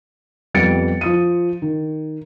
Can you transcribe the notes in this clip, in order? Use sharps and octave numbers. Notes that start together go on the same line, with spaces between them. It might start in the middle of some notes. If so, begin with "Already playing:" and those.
F2 G3 B3 A6 C#7 D7
F3 D#6 D#7
D#3